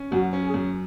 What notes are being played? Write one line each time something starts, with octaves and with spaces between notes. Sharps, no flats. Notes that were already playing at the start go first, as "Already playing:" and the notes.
Already playing: C#4
F#2 F#4
C#4
G#4
F#2